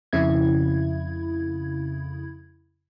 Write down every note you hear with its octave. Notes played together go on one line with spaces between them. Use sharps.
F2 C#3 E4 G#6